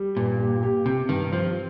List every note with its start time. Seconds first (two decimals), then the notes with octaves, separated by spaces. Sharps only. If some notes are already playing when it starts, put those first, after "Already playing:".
Already playing: G3
0.17 G2 A#2
0.39 G4
0.63 G4
0.86 C3 G4
1.09 G2 D#3
1.32 F3 C4